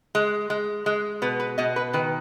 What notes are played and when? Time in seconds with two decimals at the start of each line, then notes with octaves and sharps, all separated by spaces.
0.15 G#3
0.50 G#3
0.86 G#3
1.22 B2 B4
1.40 B4
1.58 B2 D#5
1.76 B4
1.93 D#3 B4